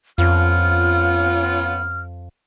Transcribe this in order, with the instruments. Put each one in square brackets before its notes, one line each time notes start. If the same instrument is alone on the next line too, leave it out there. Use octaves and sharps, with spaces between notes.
[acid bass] F2 [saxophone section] B3 C#4 F4 [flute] F6